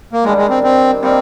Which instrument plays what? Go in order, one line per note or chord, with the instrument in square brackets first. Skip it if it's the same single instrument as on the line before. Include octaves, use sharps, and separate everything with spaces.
[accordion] A#3
[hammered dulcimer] D#3 G3 D4 [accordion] G#3
[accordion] G#3
C4
C4
[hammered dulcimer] G3 A#3 D#4 [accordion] C4